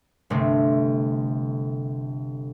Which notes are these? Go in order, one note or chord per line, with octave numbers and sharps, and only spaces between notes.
G1 C3 A3 C4